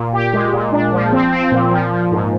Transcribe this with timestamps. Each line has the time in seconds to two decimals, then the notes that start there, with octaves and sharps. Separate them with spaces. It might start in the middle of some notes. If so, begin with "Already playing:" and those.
Already playing: A#2
0.13 G4
0.33 G#3
0.53 A#2
0.72 D4
0.93 F3
1.12 C4
1.32 C4
1.52 A#2
1.71 F3
1.91 F3
2.12 G#2